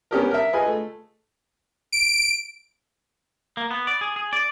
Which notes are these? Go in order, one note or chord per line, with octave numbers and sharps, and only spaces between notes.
B3 C#4 G4 A#4
A#4 E5
F4 G#4 B4 D#5 G#5
A3
D7
A#3
B3
D5
G#4
G#4
D5